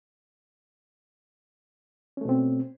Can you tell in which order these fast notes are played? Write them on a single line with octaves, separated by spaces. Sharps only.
C#4 A3 B2 C4